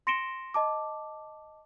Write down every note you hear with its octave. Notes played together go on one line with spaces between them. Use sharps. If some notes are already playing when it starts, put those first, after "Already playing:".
C6 A#6 C#7 D7 E7 G7
D#5 A5 D6